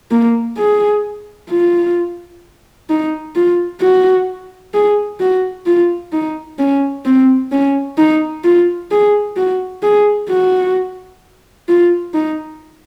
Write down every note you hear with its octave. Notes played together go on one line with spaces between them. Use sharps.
A#3
G#4
F4
D#4
F4
F#4
G#4
F#4
F4
D#4
C#4
C4
C#4
D#4
F4
G#4
F#4
G#4
F#4
F4
D#4